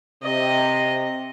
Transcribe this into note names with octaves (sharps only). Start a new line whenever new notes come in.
C3 D#5